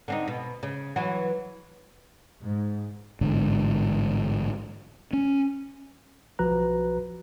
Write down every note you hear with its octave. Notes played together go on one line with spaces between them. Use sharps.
D3 C4 D#4
B2
C#3
E3 F#3 F#4
G#2
A1 G#2 D3
C#4
B1 F3 F#4 B4 A#5 F#6